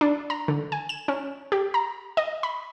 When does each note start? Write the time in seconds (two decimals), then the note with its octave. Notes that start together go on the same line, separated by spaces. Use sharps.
0.01 D4
0.30 A#5
0.48 D3
0.72 G#5
0.89 E7
1.08 C#4
1.52 G4
1.74 A#5
2.17 D#5
2.43 B5